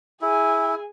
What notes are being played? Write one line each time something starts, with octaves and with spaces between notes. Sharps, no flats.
E4 G#4 G#5